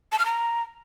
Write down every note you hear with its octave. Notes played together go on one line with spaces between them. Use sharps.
A5
F6
A#5